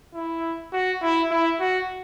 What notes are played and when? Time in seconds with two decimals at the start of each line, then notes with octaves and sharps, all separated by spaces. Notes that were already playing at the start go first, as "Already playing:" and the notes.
0.14 E4
0.73 F#4
1.02 E4
1.31 E4
1.60 F#4